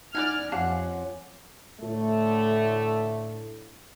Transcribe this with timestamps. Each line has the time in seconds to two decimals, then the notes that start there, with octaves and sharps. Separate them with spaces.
0.15 D#4 E4 D5 F#5 G#5 F6
0.52 F2 C#4 F4 G4 F5 F#5 A5 D6
1.81 A2 D3 A3